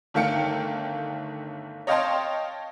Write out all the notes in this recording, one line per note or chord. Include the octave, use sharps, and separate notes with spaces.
G1 D#3 A3 F5 G5 C#7
C#5 D#5 F5 G5 A5 C6